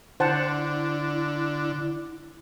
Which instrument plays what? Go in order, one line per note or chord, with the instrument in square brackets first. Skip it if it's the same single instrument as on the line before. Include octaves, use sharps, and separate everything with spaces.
[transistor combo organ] D3 [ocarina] E4 [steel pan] C5 F#5 A5